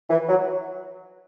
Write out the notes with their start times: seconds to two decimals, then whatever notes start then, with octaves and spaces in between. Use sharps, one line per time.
0.10 E3
0.28 F#3